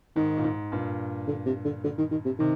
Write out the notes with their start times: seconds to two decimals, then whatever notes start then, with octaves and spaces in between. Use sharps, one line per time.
0.16 G#2 D#3
0.37 A#2
0.44 G#2
0.72 G2 A#2
1.28 D3
1.46 C3
1.65 D3
1.84 D3
1.98 D#3
2.11 D#3
2.26 C3
2.39 C3 D#3